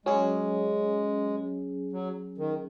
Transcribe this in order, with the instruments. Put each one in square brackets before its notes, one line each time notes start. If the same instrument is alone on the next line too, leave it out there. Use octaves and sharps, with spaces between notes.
[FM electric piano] F#3 C#4 G#4 [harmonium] G#3
[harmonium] F#3
D#3